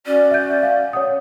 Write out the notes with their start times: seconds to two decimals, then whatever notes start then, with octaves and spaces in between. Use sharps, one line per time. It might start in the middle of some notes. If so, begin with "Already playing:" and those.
0.06 C#4 F#4 D5
0.31 E5 G6
0.63 F5
0.93 C#5 F#5 D#6